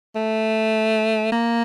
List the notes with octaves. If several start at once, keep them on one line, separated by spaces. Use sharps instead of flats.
A3
A#3